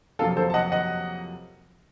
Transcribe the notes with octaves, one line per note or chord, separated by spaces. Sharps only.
F2 C3 F#3 A#3 F4 A4
A4 C5
A5
D#5 F#5
D#5 F#5